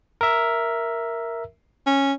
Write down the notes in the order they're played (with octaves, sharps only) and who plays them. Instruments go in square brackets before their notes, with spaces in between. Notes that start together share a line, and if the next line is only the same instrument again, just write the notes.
[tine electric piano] A#4 E5
[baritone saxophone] C#4